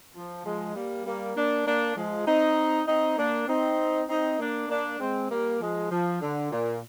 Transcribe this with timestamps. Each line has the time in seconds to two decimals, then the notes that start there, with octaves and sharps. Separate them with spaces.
0.14 F3
0.45 F3 G#3
0.75 G3 A#3
1.06 G3 A#3
1.36 A#3 D4
1.66 A#3 D4
1.96 F3 G#3
2.27 C4 D#4
2.87 C4 D#4
3.18 A#3 D4
3.48 C4 D#4
4.09 C4 D#4
4.39 A#3 D4
4.69 A#3 D4
5.00 G#3 C4
5.30 G3 A#3
5.60 F3 G#3
5.91 F3
6.21 D3
6.52 A#2